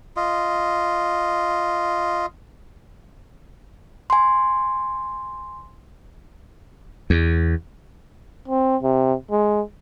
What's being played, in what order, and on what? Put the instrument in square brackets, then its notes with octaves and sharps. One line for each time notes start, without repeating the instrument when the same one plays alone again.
[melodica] F4 D#5
[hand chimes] G#5 C6
[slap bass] E2
[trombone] C4
C3
G#3